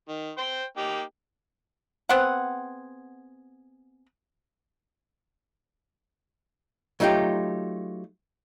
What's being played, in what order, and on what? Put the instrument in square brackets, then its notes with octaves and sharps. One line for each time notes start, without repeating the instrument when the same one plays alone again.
[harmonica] D#3
C5 G5 C6
A#3 D#4 G4
[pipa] B3 C4 G#4 F#5
[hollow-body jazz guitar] F#3 A3 D#4 F4 G4